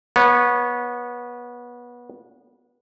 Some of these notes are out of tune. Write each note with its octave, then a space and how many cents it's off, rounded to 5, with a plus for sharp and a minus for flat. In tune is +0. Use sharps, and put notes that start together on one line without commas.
B3 -25 C#5 +0